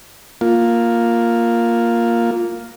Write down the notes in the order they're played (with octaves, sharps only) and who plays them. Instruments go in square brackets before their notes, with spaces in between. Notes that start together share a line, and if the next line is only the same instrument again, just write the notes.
[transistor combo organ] A#3 F4